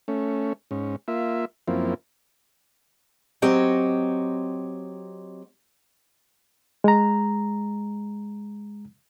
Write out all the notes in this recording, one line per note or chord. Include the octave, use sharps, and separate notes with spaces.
A3 C#4
G#2 C#4
A#3 F4 E5
F#2 F3 A#3 C4 E4
F#3 C4 G4 C#5 D#5
G#3 A#5